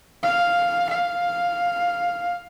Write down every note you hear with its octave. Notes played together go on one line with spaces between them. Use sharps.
F5
F5